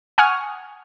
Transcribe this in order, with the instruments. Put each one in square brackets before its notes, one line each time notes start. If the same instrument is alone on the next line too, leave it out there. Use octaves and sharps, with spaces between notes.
[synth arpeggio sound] F#5 G#5 C#6 D#6 F6